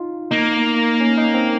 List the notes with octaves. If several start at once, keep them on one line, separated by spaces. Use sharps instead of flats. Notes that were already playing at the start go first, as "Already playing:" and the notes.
Already playing: D#4 F4
A#3 D#4
C#4
D#4
C4